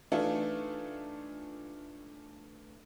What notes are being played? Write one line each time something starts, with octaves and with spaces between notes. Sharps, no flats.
E3 A3 D4 D#4 F4 A4